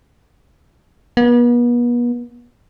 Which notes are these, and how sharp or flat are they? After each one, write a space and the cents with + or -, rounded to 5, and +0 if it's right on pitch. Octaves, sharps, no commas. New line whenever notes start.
B3 -40